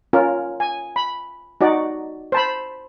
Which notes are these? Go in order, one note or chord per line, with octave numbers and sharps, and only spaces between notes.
C#4 F4 A#4
G#5
B5
D#4 F#4 D5
C5 A5 B5